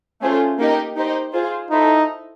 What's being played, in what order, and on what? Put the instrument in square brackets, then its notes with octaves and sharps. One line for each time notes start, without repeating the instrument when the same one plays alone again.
[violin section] A3 C#4 F4 G#4 C5
A#3 D#4 G4 A#4 D#5
D#4 G4 C5 D#5
F4 G#4 C5
[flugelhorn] D#4 [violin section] E4 A4 C5 E5